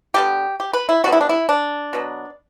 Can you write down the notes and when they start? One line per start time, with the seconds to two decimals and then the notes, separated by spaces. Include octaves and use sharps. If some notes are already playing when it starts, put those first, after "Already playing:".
0.14 D3 G3 B3 G4
0.60 G4
0.73 B4
0.89 E4
1.04 D3 G3 B3 F#4
1.12 E4
1.21 D4
1.29 E4
1.49 D4
1.93 B2 F#3 B3